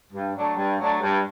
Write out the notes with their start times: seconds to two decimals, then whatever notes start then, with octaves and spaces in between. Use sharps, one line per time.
0.13 G2
0.34 F#3 A3 D4
0.56 G2
0.79 F#3 A3 D4
1.01 G2